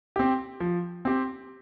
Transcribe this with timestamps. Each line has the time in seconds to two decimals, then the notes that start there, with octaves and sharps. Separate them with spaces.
0.16 C4 G4
0.60 F3
1.05 C4 G4